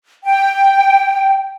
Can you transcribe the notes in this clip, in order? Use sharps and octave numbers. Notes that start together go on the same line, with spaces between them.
G5